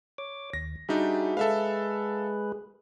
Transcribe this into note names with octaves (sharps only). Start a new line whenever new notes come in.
C#5 D6
D#2 A#6
G3 D4 D#4 F#4 G#4 E5
G#3 G#4 A4 B4 E5 F5